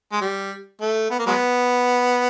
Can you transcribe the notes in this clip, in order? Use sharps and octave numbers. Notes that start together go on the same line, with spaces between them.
G#3
G3
A3
B3
A#3
F#3 G#3 B3